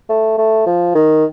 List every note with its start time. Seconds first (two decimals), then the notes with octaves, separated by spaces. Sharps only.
0.09 A3
0.38 A3
0.67 F3
0.95 D#3